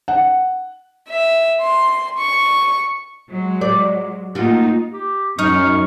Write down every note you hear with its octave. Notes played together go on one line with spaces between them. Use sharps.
F#5
E5
C6
C#6
F#3 G#3
D5
A3 A#3 D#4 F4 F#4
G4
F#2 D#4 C#6 F6